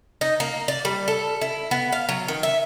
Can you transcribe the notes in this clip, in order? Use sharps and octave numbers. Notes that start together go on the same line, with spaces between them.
D#4
A#3
D5
G3
A4
E4
B3
F5
F#3
D#3
E5